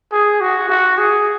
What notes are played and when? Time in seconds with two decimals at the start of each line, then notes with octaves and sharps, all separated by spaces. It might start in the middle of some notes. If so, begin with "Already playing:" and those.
0.12 G#4
0.41 F#4
0.69 F#4
0.98 G#4